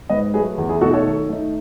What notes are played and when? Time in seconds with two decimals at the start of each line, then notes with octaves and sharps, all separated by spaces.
0.09 G#2 B4 D#5
0.34 F#3 G#4 B4
0.37 A3
0.58 E2
0.69 E4 G#4
0.81 B2 A3 D#4 F#4 A4
0.94 A4 C#5
1.05 D#3
1.29 A3 D#4